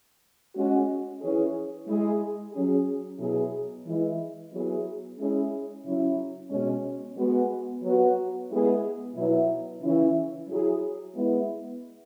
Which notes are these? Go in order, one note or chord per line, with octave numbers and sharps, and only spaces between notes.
G#3 C#4 F#4
E3 C#4 G#4
G#3 E4 G#4
F#3 C#4 G#4
B2 F#3 E4 G#4
E3 G#3 E4
F#3 B3 E4 G#4
G#3 C#4 E4 G#4
C#3 F#3 C#4 E4
B2 G#3 C#4
G#3 B3 F#4
F#3 B3 F#4
G#3 B3 E4 G#4
B2 F#3 B3 E4
C#3 E3 C#4 E4
F#3 E4 G#4
G#3 B3 E4